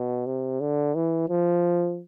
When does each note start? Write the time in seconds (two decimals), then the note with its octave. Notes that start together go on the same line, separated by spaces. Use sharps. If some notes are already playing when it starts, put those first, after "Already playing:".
Already playing: B2
0.26 C3
0.60 D3
0.95 E3
1.29 F3